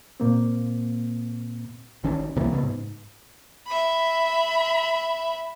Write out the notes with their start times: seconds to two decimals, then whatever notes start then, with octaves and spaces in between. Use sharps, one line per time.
0.20 A#2 A#3 C4
2.04 G#1 D#3 C#4 D4
2.36 C2 C3 E3 A#3
2.51 C#3 B3
2.63 G#2
3.67 E5 B5